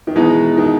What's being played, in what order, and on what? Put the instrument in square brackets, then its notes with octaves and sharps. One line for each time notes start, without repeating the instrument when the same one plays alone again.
[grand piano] D#3
[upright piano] B2 G#3 D#4 [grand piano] E3
[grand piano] D#3